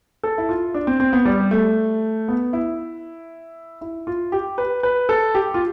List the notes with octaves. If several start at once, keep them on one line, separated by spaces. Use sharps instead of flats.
A4
E4
F4
D4
C4
C4
B3
G3
A3
B3
E4
E4
F4
G4
B4
B4
A4
G4
F4